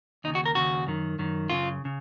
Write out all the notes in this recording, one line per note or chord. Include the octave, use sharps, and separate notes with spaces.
D#2 C#3 D#4
F#4
A#4
D#2 C#3 F#4
F#2 D#3
F#2 D#3
F#2 C#3 F4
C#3